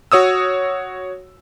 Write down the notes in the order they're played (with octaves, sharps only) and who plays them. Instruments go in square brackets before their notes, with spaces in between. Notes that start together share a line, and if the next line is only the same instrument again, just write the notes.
[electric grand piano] F#4 C#5 D#6 E6